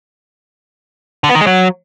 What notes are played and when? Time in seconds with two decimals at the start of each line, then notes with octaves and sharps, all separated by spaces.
1.24 D3
1.29 B3
1.35 D#3
1.41 G#3
1.47 F#3